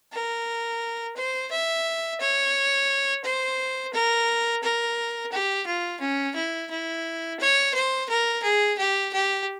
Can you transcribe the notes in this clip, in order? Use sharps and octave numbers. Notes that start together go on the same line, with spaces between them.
A#4
C5
E5
C#5
C5
A#4
A#4
G4
F4
C#4
E4
E4
C#5
C5
A#4
G#4
G4
G4